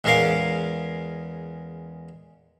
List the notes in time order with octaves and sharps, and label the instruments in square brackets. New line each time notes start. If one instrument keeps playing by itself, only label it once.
[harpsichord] E2 G#3 C#4 A#4 F5 D6